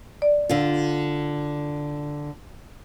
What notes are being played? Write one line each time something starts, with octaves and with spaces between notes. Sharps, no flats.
D5
D3 F4